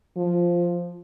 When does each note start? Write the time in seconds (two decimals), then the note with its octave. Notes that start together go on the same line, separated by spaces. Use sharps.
0.16 F3